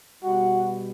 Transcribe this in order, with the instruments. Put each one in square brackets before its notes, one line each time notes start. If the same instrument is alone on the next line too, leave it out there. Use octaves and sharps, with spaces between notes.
[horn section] B2 G3 F#4 F#5